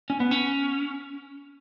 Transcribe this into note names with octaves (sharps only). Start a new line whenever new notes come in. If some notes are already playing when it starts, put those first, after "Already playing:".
C#4
B3
C#4